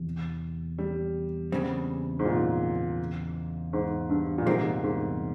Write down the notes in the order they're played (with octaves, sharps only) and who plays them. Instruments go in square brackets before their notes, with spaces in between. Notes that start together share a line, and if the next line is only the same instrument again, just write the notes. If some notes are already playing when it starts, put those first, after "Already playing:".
Already playing: [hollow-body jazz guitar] E2 C3
[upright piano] G3
[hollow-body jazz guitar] E2 C#3 G3 C4
[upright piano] G#2
A#2
G#2
G2
A#2
[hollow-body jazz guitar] E2 C3 G3 A#3 [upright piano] G#2
[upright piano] G#2